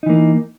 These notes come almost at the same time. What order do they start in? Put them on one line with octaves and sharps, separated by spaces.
D#4 E3 A#3